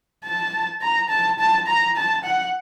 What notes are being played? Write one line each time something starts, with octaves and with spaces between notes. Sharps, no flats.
A5
A#5
A5
A5
A#5
A5
F#5